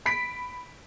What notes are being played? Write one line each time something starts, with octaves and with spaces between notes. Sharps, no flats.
B5 B6 D7